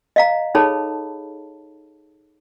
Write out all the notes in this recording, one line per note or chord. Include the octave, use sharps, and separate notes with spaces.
D#5 F5 A#5
D#4 G#4 A4 C#5 A5 B5